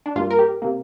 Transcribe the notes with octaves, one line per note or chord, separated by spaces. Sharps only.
D4
G2 G3 A#3 F4
A#4
G4
C3 A#3